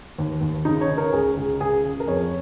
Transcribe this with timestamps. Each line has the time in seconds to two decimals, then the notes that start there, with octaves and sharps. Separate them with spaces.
0.18 D#2
0.41 D#2
0.65 C#3 D#4
0.81 C#5
0.89 C#3
0.98 A#4
1.13 C#2 G#4
1.37 C#2
1.61 C#3 G#4
1.84 C#3
2.00 A#4
2.08 F2 C#5